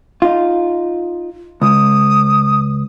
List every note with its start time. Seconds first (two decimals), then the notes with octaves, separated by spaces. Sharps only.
0.22 D#4 F4
1.62 C#2 D#6